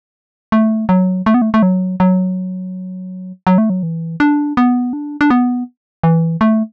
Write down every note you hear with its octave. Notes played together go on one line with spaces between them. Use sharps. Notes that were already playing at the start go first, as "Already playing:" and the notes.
A3
F#3
A3
B3
A3
A3
F#3
F#3
F#3
A3
F#3
E3
D4
B3
D4
D4
B3
E3
A3